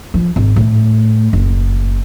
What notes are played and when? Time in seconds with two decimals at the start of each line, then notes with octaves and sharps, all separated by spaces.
0.14 F3
0.36 G#1
0.56 A2
1.33 F#1